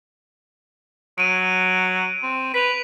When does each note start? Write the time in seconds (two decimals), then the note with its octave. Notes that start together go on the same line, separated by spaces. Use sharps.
1.18 F#3 D7 D#7
2.23 C4
2.54 B4 B6 F7